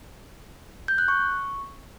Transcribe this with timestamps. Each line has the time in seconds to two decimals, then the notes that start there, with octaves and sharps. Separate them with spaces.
0.88 G6
0.98 F#6
1.08 C#6